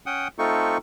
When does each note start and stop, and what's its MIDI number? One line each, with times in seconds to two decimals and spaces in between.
0.06 0.28 61
0.06 0.28 78
0.06 0.28 79
0.06 0.28 87
0.39 0.78 57
0.39 0.78 60
0.39 0.78 63
0.39 0.78 65
0.39 0.78 69
0.39 0.78 85